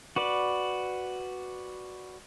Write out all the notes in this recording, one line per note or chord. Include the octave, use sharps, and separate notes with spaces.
F#4 B4 D5